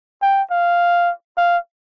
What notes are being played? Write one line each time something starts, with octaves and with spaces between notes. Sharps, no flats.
G5
F5
F5